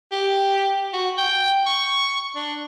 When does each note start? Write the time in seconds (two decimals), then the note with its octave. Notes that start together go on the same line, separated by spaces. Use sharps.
0.12 G4
0.93 F#4
1.18 G5
1.66 C#6
2.36 D4